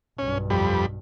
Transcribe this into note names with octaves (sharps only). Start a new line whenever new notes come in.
B1 G2 C#4
F2 G3 B5